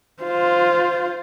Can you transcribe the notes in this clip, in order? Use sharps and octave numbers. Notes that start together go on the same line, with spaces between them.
F4 C5